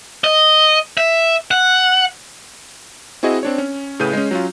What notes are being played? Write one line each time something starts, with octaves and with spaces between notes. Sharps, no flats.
D#5
E5
F#5
C4 E4 F#4 G#4 D#5
C4 D4 C#5
C#4
A2 C#3 G#4 B4 G6 D#7
G#3 C#4
F#3 C#4 F4